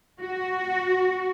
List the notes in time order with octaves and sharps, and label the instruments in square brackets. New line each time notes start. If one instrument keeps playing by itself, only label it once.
[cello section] F#4